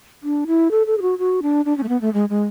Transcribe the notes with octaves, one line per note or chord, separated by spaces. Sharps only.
D4
E4
A4
A4
G#4
F#4
F#4
D4
D4
C#4
A3
B3
A3
G#3
G#3